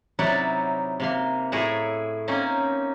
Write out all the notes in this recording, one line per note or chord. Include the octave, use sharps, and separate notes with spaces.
C3 F#3 D#4 E4 D5 F#5
C3 A#3 C6
A2 E4 G#4 C#5 A#5
A#3 C4 C#4 D#4